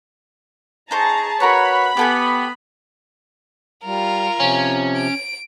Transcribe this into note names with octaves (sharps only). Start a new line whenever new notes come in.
D#4 G#4 C5 A5 A#5 C#6
F#4 A#4 B4 C#5 A#5 B5 C#6
B3 G4 A4 G#5
G3 F4 A#4
C3 F3 C#4
D7